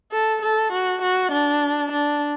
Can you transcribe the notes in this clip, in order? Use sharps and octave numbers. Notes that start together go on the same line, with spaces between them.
A4
A4
F#4
F#4
D4
D4